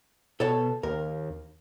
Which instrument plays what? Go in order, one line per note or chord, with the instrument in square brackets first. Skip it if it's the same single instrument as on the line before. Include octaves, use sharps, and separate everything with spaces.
[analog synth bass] B2 [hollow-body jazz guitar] A4 C#5 A5
[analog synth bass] D#2 [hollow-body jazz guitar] A#4